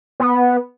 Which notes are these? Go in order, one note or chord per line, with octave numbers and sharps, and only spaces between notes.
B3